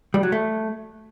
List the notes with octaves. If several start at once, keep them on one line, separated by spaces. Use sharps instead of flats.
G3
F#3
A3